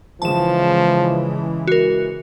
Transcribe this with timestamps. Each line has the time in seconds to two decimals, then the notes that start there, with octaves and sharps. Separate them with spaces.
0.22 C#3 E3 F3 G#3 A5 E7
1.67 F#4 A#4